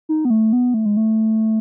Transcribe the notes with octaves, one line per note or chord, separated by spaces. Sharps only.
D#4
B3
A3
B3
A3
G#3
A3